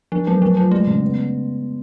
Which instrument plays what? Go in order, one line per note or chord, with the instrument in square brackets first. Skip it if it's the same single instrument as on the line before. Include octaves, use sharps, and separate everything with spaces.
[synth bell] F3 [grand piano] D4
[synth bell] F#3 [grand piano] A3
[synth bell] F3 [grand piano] A3
[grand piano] F3 [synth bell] F#3
[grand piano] G#3 [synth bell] A3
[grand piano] C#3
B3